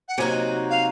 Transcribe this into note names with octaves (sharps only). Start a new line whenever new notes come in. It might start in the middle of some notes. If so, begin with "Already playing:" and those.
F#5
C3 F#3 A#3 D#4 F#4 G#5
F5